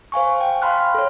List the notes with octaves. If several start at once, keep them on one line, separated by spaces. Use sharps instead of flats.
C5 F5 G#5 C#6
G5
F5 A5 B5 C6 F6 F#6
A4 C#5